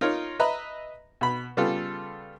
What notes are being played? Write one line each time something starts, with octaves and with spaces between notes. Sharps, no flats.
D#4 F4 A#4 C#5
B4 D#5 E5 A#5 B5
B2 B5
C#3 G3 B3 F4 A4